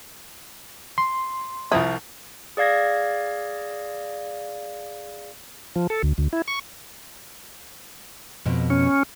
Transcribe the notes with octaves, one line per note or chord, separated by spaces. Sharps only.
C6
C2 F3 E4 D#6
G#4 D5 F5 G#6 A#6
F3
A4
D2
D2
E4
C#6
F2 B2
C#4